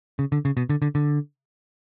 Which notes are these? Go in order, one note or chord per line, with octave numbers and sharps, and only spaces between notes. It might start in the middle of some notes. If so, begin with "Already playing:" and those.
C#3
D3
C#3
B2
D3
D3
D3